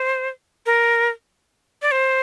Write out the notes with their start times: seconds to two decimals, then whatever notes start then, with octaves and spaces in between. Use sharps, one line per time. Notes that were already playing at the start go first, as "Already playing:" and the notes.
Already playing: C5
0.66 A#4
1.82 D5
1.91 C5